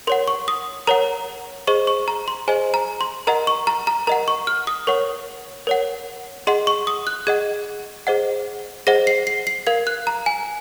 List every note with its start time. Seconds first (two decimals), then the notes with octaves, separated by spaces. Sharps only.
0.07 A#4 C#5 F#5 C6
0.28 C#6
0.48 D#6
0.87 A#4 C#5 F#5 A#5
1.67 G#4 C5 D#5 C#6
1.87 C#6
2.08 A#5
2.28 C6
2.48 G#4 C5 D#5 G#5
2.74 A#5
3.01 C6
3.27 A#4 D#5 F#5 A#5
3.47 C#6
3.67 A#5
3.87 A#5
4.07 A#4 D#5 F#5 A#5
4.28 C#6
4.47 F6
4.67 D#6
4.87 A#4 C#5 F#5 C#6
5.67 A#4 C#5 F#5
6.47 G#4 D#5 F#5 C6
6.67 C#6
6.87 D#6
7.07 F#6
7.27 G#4 D#5 F#5 G#6
8.07 G#4 C5 D#5 F#5
8.87 G#4 C5 D#5 F#5 A#6
9.07 C7
9.27 C7
9.47 C7
9.67 A#4 F5 G#6
9.87 F#6
10.07 A#5
10.26 G#5